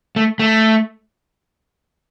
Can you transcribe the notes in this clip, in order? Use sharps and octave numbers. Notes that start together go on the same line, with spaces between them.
A3
A3